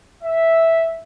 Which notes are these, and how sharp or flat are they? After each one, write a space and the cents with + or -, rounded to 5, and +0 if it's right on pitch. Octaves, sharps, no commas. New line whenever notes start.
E5 -5